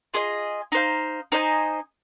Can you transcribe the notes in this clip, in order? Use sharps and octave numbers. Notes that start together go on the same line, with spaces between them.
F4 G#4 D#5
D#4 C5 F5
D#4 C5 D#5 G#5